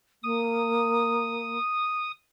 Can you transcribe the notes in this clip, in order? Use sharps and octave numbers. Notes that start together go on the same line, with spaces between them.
A#3 D#6